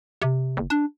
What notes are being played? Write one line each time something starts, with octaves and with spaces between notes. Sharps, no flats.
C3
F#1
D4